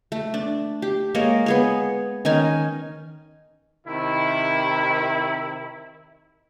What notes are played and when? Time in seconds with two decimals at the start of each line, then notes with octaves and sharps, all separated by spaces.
0.12 A3
0.34 D4
0.82 G4
1.15 G#3 A#3 C#5 D#5
1.46 B3 G#4 C#5
2.25 D#3 C#4 D#4 G#5
3.87 C3 D#3 E4